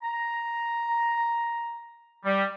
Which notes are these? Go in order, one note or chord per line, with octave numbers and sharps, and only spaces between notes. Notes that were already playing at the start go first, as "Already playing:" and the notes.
A#5
G3